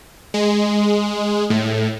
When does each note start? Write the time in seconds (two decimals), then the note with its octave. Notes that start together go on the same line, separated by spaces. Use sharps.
0.34 G#3
1.50 A2